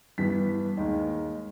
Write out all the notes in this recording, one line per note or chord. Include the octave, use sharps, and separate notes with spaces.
G2 E3 G3 B3 B6
D#2 D#3 G#3